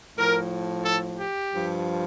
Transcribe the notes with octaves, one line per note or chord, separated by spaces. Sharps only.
A2 F3 A#4
A4
G4
G2 F3